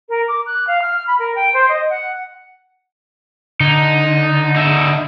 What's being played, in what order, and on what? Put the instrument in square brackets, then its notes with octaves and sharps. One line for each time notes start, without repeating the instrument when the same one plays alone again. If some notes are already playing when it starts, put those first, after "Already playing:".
[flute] A#4
D6
F#6
F5
F6
B5
A#4
G5
C5
D#5
F#5
[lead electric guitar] D3 [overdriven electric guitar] D#4
[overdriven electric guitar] D#4 E5